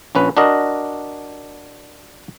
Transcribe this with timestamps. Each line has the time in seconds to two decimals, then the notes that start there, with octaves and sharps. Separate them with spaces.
0.15 A#1 C#4 B4
0.37 D4 F#4 A#4 D#5